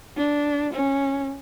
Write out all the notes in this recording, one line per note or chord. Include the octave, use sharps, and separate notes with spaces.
D4
C#4